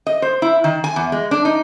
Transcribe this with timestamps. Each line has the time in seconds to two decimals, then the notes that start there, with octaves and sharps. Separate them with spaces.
0.07 D#5
0.22 C5
0.42 E4
0.64 D#3
0.84 G#5
0.96 E2
1.12 G#3
1.31 D4
1.45 D#4